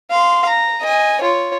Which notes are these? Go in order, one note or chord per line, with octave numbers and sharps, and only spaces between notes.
F5 C6
A#5
D#5 G#5
F4 C#5